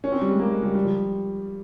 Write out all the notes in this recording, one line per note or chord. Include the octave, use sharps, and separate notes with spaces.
C#4
C4
G3
G#3
A#3
G#3
G3
G3
F3